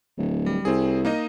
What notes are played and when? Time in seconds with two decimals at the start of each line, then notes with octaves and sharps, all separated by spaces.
0.17 D1
0.46 G3
0.65 C2 C4 G#4
1.05 A#3 D#4 D#5